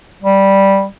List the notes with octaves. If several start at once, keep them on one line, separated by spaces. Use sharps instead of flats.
G3